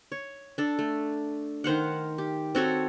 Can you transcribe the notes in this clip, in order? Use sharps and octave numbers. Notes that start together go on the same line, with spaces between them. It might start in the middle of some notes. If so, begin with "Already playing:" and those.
C#5
D4 A4
A3
D#3 C5 F5 F#5
G4
C4 F#4 A4 C#5